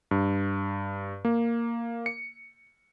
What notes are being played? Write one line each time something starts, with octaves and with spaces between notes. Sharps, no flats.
G2
A#3
C#7